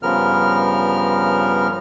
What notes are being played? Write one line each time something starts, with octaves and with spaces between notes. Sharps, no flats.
G2 C#3 F3 B3 A#4 F6